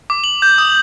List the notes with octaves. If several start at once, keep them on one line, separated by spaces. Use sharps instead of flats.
D6
F#7
G6
D#6